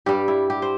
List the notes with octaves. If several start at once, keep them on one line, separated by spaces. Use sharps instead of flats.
G2 G3 G4
E4
G4
C5